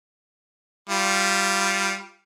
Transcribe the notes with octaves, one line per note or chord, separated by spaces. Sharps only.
G3 F4